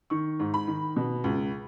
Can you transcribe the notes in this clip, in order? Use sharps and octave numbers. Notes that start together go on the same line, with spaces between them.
D#3 C#6
G#2
B5
D#3
B2
C#2